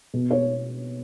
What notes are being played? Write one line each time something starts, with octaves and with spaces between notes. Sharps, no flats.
B2
C#5